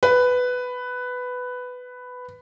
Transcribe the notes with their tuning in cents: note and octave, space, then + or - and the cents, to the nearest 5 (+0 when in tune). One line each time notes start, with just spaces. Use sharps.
B4 +10